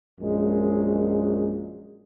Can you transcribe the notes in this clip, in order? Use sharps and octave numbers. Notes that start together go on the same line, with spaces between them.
A#1 F#2 G#3